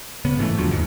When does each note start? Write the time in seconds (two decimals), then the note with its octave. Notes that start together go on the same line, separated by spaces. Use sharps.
0.25 C#3 B3
0.39 G#2 E3 F3 A3
0.58 E2 D3 F3 F#3
0.71 G1 D#2 G#2